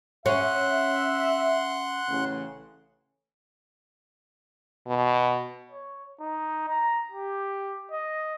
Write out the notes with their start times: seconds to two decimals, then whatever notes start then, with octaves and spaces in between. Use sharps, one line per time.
0.26 C#4 E5 F#5 C6 F#6
2.09 A1 C#3 C#4
4.87 B2
5.71 C#5
6.20 D#4
6.69 A#5
7.12 G4
7.92 D#5